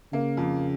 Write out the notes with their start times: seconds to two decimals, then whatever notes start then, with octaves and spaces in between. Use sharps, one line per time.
0.13 C#3 A#3
0.37 F2